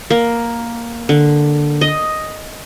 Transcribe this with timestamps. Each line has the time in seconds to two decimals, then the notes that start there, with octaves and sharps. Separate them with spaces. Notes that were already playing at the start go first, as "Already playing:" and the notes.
0.10 A#3
1.09 D3
1.81 D#5